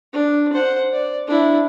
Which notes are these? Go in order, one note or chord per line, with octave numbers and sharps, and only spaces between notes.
D4
C5 F#5
D5
D4 E4